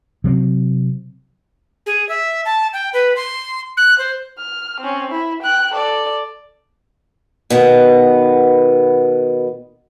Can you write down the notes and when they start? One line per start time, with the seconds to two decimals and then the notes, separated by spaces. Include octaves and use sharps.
0.24 C3 F#3 C4
1.86 G#4
2.09 E5
2.45 A5
2.73 G5
2.94 B4
3.16 C6
3.77 F#6
3.98 C5
4.38 F6
4.80 C4 C#4
5.11 E4
5.42 G5 F#6
5.74 A4 D5
7.50 B2 D#3 B3